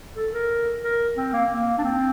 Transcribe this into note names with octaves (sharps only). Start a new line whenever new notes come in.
A4
A#4
A#4
C4
A#3
A#3
D4
C4